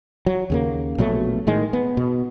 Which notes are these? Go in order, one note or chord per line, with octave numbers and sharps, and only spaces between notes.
F#3
D#2 C#3 A#3
A#1 B2 F#3 A3
A2 D#3 G#3
B3
B2